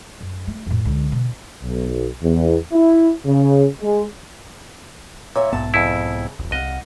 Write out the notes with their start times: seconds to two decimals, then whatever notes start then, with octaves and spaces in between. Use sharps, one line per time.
0.21 F#2
0.47 A3
0.66 F2 A2
0.85 C#2 D3
1.12 B2
1.63 B1
2.22 E2
2.73 E4
3.26 C#3
3.82 G#3
5.36 A#2 C#5 E5
5.53 B1 G#2 B3 A5
5.74 F2 C#3 E4
6.39 E1 C2
6.52 C2 D#5 F5 F#5